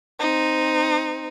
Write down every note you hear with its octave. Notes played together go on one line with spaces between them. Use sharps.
C4 D#4